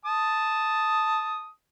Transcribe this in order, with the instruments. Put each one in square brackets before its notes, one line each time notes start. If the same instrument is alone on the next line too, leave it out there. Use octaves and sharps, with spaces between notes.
[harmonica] A5 D#6